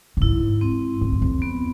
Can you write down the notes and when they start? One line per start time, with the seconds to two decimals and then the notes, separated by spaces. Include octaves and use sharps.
0.17 A2
0.22 G#2 E4
0.61 C4
1.01 F2
1.12 E2
1.22 F2
1.42 B3